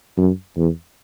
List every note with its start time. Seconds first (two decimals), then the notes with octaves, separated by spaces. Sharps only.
0.18 F#2
0.56 E2